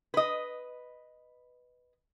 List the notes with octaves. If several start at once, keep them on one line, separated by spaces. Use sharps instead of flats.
B4 D#5